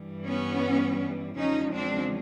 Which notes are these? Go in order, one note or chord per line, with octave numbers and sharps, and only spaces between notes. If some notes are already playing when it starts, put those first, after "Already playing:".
Already playing: G2 E3 G3
B3 C#4
E2 C#3 F3 G#3 C#4 D#4
C4 D4